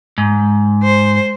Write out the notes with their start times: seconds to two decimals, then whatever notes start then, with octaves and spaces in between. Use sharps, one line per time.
0.18 G#2
0.83 C5